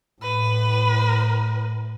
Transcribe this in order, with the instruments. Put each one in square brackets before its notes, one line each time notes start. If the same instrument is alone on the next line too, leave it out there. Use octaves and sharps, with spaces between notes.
[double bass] A2 [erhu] B4